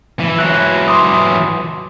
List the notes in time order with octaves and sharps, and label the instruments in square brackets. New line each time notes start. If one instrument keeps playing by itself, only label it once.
[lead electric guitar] E3
[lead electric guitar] E3 F#3 [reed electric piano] F#6
[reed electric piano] C6 D6 D#6